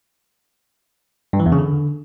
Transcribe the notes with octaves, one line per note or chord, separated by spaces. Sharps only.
G2
E3
E2
C#3
D3